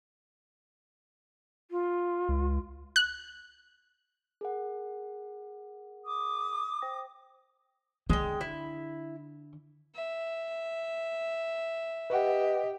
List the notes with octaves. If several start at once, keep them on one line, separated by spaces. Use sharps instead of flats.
F4
C#2
F#6
G#4 A#4 F#5
D6 D#6
C5 G5 A#6
D3 G#3 G5
E4
E5
G4 B4 D#5 F#5